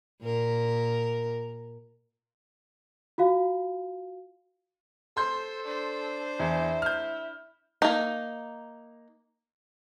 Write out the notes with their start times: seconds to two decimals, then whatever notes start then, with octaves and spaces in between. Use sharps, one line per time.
0.22 A#2 A#4
3.18 F4 F#4 F5
5.17 A4 C5 C6 G6
5.64 D4 C5
6.40 E2 E4
6.82 F6 G6
7.82 A#3 D#4